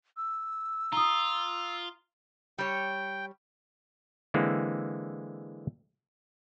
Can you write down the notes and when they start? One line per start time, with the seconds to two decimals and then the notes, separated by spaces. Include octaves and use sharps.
0.17 E6
0.92 F4 A#5 D#6
2.58 G3 C#5 G5
4.34 D3 E3 G#3 A#3 C4